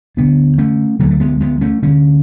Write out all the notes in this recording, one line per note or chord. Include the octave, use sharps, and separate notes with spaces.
D2 D3 B3 D4
A3 C#4
D2 D3 F#3 A3
A3
G#3 B3
G#3 B3
A3 C#4
D2 D3 A3 C#4